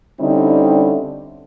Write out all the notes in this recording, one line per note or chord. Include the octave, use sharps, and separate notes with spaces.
D3 G3 C4 C#4 D#4 E4